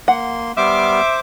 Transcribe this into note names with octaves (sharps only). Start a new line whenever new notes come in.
A#3 F#5 C6
G3 B3 C5 E5 D6 F6